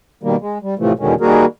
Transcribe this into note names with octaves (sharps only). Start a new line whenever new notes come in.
B2 D#3 G3 A#3
G#3
G3
A2 C3 E3 F3 A3
E2 B2 D3 D#3 G#3 C#4
D#3 G3 A#3 F#4 G#4 A#4